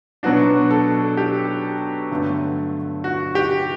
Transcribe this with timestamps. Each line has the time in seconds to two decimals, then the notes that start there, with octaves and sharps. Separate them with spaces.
0.23 B2 F#3 B3 D4 F#4
0.71 A4
1.17 G4
2.11 G2 D3 F#3 A3
3.04 F#4
3.35 G4